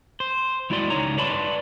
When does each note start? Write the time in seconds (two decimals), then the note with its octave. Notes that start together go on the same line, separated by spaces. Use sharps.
0.20 C5
0.70 D#2 G#3 E4 F#4 D5 C6
0.90 C#2 D#4 C#5 A#5
1.18 B4 C#5 D5 A5 B5 C6